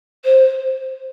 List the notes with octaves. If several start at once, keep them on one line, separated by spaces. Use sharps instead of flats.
C5